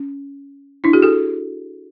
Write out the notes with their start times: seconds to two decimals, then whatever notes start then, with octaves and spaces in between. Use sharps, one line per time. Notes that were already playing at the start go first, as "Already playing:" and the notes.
Already playing: C#4
0.84 D4 E4
0.93 F#4 G#4
1.02 G4 A4